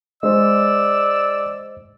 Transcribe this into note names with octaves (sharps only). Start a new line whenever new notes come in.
G#3 C5 D5 D#5 E6